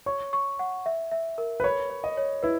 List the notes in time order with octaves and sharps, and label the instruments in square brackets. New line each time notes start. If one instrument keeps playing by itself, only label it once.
[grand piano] C#5 [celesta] C#6
[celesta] C#6
F#5
E5
E5
A#4
[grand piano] B4
[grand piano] C#5 [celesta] B5
[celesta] C#5
[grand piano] D#5
[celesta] C#5
[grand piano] E4 [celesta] B4